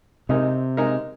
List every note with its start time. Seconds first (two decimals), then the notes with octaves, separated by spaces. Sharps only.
0.29 C3 G#3 D#4 A#4
0.77 G#3 D#4 A#4